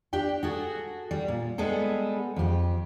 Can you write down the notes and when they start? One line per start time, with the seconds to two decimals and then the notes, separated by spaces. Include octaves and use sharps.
0.13 D4 G4 G5
0.43 F#4 G#4 A4
1.11 G3
1.28 A#2
1.58 G3 G#3 B3 G#4 A4
2.36 F2 G4